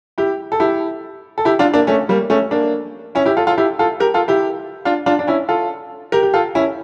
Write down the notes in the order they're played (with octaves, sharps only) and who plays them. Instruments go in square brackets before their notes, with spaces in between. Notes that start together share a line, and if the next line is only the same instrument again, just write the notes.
[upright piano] E4 G4
A4
E4 G4
A4
E4 G4
D4 F4
A#3 D4
A3 C#4
G3 A#3
A3 C#4
A#3 D4
C#4 E4
E4 G4
F4 A4
F4 A4
E4 G4
F4 A4
G4 A#4
F4 A4
E4 G4
D4 F4
D4 F4
D4
C#4 E4
F4 A4
G4 A#4
G4
F4 A4
C#4 E4